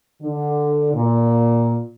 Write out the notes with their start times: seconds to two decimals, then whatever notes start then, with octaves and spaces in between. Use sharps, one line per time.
0.22 D3
0.94 A#2